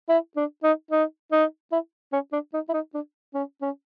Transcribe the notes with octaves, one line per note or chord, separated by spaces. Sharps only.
E4
D4
D#4
D#4
D#4
E4
C#4
D4
D#4
E4
D#4
D4
C#4
C#4